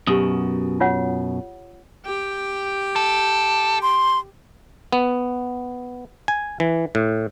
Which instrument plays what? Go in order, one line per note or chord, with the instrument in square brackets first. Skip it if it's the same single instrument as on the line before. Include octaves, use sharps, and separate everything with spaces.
[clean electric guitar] F#2 B2 [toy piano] G4 D#6
[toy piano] F4 C#5 F#5
[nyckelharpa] G4 G5
[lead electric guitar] A4
[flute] C6
[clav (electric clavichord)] B3
G#5
E3
A2